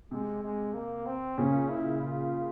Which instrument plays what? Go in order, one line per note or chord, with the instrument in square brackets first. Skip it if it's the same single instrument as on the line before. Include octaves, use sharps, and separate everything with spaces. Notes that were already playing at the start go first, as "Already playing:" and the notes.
[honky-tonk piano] C3 [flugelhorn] G#3
[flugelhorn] G#3
A#3
C4
[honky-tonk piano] A#2 C#3 [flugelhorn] C#4
[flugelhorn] E4
F4